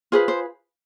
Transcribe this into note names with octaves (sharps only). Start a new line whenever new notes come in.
F4 G#4 B4 C5
C5